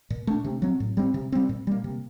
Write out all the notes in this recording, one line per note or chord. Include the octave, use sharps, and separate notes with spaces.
A#2
A3 D4
C3
F#3 C4
A2
G3 C4
C3
G3 C4
A#2
G3 A#3
C3